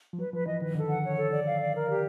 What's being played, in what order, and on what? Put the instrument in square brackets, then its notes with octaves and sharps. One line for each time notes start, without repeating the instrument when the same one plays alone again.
[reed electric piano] F3
[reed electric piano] F#3 [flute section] B4
[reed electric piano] F3 [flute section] B4
[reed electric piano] E3 [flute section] D#5
[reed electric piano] D#3 [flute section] B4
[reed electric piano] D3 [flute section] A4
[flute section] F#5
C#5
A4
D5
F5
D5
A#4
G4